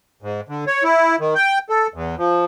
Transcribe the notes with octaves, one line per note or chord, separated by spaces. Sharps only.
G#2
D3
C#5
E4
D#3
G5
A4
E2
F3